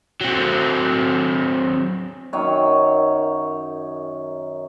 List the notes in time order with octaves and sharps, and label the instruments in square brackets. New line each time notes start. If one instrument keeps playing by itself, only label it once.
[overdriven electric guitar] F#3 C4
[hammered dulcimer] F#2 D#3 C#5